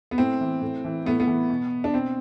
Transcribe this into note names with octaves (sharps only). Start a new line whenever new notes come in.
B3
A2 C4
E3
A2
E3
A2 B3
B3
E3
B2
D4
B2 C4